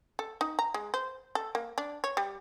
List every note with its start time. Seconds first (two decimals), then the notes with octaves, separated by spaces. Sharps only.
0.19 A4
0.41 D#4
0.59 A#5
0.74 G#3
0.94 C5
1.35 A4
1.55 A#3
1.78 D4
2.04 C#5
2.17 G3